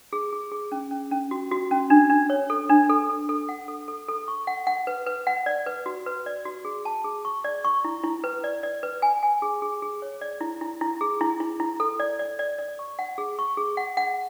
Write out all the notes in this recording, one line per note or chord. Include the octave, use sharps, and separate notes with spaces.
G#4
G#4
G#4
C#4
C#4
C#4
F#4
F#4
C#4
D4
D4
C#5
A4
D4
A4
A4
A4
F#5
A4
A4
A4
C#6
F#5
F#5
B4
B4
F#5
D5
B4
F#4
B4
D5
F#4
G#4
A5
G#4
C#6
D5
C#6
E4
E4
B4
D5
D5
B4
G#5
G#5
G#4
G#4
G#4
C#5
D5
E4
E4
E4
G#4
E4
E4
E4
A4
D5
D5
D5
D5
C#6
F#5
G#4
C#6
G#4
F#5
F#5